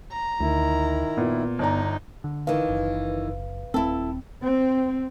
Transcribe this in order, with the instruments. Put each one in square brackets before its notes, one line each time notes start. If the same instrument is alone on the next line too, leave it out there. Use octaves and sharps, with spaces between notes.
[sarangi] A#5
[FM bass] D2 [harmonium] D#3 E4
[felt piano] A#2 [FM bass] B3
[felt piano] G1 D5 A#5 [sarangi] D#4
[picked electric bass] D3
[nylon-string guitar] D#3 E3 [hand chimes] B4 F5
[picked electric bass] F#1
[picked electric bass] D#1 C4 [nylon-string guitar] E4 A4
[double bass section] C4